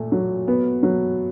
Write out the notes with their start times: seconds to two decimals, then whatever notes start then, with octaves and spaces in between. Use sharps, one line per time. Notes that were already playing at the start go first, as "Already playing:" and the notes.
Already playing: A#2 A3
0.12 F#3
0.48 B3
0.83 F#3